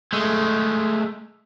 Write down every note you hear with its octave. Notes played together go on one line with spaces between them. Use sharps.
G#3 A3